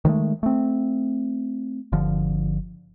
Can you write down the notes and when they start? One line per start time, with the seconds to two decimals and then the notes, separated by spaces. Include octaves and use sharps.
0.05 D#3 F3 G#3 A3
0.43 A3 C4
1.92 G1 D3 F3